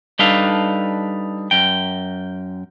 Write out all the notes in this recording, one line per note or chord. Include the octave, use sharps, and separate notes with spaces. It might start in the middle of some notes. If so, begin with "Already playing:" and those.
G3 D4 D#4 A4 B4 F5
F#2 G5